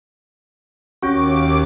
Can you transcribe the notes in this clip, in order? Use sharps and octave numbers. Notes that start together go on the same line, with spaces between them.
D#2 C#4 F#4 C#6 D6